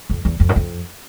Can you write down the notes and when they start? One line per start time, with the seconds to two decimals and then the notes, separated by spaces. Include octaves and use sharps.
0.10 F2
0.25 E2
0.40 F2
0.49 F#2
0.56 F2